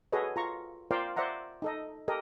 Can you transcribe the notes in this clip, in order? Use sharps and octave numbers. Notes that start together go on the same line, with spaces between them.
F#4 G#4 A4 B4 C#5 D#5
F4 A#5 C#6
F4 A#4 C5 D5 F5 G5
C5 D5 E5 F#5 A#5
D#4 A4 D#5
G4 A4 A#4 D#5